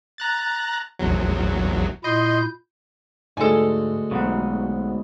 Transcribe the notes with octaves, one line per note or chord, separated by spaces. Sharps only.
A#5 F#6 A6
A#1 E2 F#3
A#2 E4 D#5 C6 G6
D2 G#2 G#3 A4 G#5
B1 G#2 B2 F#5